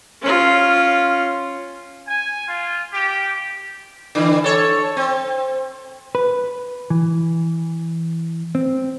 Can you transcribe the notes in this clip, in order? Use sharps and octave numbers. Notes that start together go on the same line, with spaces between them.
C#4 F4
G#5
F4
G4
D3 E3
A4 C#5
C4
B4
E3
C4